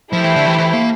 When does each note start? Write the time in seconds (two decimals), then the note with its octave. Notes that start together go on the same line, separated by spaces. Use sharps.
0.13 F3 A3 E4 G4 C5
0.24 E3
0.36 D3
0.46 E3
0.58 E3
0.73 A#3